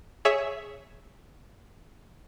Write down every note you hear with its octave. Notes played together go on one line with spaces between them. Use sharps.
G#4 C#5 E5